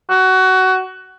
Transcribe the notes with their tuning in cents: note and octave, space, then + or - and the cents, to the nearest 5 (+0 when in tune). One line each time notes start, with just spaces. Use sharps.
F#4 +20